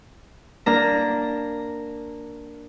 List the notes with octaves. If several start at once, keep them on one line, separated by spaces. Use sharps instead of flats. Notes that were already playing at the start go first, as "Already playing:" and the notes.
A#3 D4 A#5